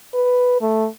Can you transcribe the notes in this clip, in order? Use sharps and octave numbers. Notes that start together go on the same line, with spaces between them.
B4
A3